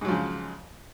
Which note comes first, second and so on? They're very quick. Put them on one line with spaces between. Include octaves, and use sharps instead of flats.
G#2 F#3 F3 C#3